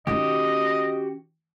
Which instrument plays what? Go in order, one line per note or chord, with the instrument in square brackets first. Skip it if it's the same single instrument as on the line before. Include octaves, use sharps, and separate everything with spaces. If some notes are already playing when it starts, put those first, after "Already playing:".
[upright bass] D#3 C#4 [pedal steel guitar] F#4 G4 [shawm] D#5